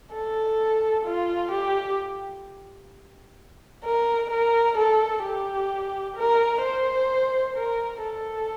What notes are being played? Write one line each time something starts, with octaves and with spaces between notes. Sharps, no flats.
A4
F4
G4
A#4
A#4
A4
G4
A#4
C5
A#4
A4